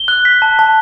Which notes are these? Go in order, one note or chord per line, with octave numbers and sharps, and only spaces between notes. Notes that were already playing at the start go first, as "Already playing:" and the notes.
Already playing: G7
F#6
B6
A5
A5